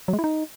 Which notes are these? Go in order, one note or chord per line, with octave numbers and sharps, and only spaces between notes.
F#3
G#3
E4
D#4